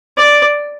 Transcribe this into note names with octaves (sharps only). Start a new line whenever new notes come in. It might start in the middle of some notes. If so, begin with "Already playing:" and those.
D5